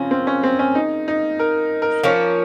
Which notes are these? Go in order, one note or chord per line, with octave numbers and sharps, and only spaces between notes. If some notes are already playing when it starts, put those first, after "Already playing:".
Already playing: C#3 F3 A#3 C4 C#4
C4
C#4
C4
C#4
D#4
D#4
A#4
A#4
F3 A#3 C#4 A#4